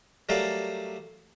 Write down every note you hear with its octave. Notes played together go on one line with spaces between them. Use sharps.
F#3 G3 A3 A#4 D5 F5